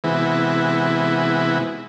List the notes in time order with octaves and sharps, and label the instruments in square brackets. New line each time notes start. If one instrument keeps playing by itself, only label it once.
[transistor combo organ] C3 E3 G#3 B3 E4 F#4